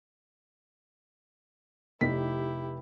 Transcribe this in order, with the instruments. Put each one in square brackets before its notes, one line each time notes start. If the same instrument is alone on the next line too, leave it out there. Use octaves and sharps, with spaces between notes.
[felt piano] F1 D#4 B6 [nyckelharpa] E4 G4